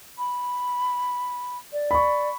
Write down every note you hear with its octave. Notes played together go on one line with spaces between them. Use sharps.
B5
D5
B5 C#6